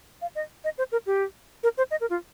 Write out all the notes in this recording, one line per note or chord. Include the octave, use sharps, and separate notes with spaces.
F5
D#5
D#5
C5
A#4
G4
A#4
C5
D#5
A#4
F4